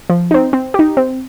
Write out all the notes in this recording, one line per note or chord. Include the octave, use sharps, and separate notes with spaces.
F3
C4 D#4
C4
D#4 G4
C4